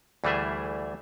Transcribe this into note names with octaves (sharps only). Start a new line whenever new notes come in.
D2 E3 G3 A3 G#4 E5